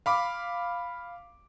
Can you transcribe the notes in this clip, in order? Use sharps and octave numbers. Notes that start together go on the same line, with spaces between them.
F5 B5 D6